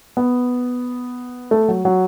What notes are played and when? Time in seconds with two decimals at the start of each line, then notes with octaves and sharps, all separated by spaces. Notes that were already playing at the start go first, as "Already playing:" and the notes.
0.17 B3
1.51 A3
1.69 F#3
1.85 F#3